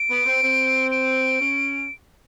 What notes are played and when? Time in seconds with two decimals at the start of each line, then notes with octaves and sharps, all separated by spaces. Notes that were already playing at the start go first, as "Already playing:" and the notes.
Already playing: D7
0.10 B3
0.26 C4
0.43 C4
0.91 D7
1.41 C#4